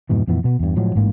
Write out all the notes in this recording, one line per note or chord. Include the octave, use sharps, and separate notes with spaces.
F2 G#2 B2 E3
F2 A#2 E3 B3
B2 B3
E2 G2
A2 F3 F#3 G#3
A1 G#2 A#3